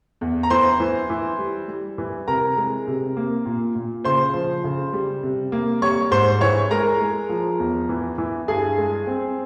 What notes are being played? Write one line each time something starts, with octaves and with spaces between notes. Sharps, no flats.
E2
A#5
E3 C5 C6
E3
E3
G3
G3
E3
C3 A#4 A#5
G#3
C3
A#3
A#2
A#2
C#3 C5 C6
F3
C#3
G3
C3
A#3
G3 C#5 C#6
G#2 C5 C6
E3 C#5 C#6
G#3 A#4 A#5
G#3
F3
E2
E3
E3
G2 G#4 G#5
G#3
C4